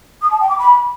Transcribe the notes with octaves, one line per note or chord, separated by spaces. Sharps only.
D#6
A5
G5
D6
B5